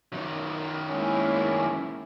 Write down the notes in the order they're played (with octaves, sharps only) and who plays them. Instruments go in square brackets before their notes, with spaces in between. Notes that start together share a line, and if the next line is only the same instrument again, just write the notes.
[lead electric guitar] F#2 D#3
[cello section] G#3 A#3 E4 [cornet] C#4